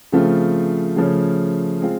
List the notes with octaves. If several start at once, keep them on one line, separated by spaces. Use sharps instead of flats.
C#3 F3 A3 C4 F4
C#3 F3 A3 C#4
G#3 C4 F4